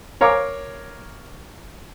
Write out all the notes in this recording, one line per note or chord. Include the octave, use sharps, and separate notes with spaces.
A#4 C#5 F5 A#5 D6